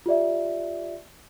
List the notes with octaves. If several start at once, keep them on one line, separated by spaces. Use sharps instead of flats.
F4 G4 D5 E5